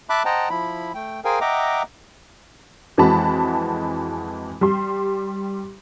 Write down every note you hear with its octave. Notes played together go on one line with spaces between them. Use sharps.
E5 A5 B5 D6 F#6
C5 D#5 F#5 G5 A5 A#5
F3 E4 B5
A3 G5
G#4 A#4 C5 F5 G5 G#5
D#5 E5 F#5 G5 A#5 D6
F2 E3 G#3 F#4 A5 B5
G3 G4 C6